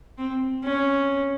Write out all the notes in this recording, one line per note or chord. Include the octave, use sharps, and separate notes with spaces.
C4
C#4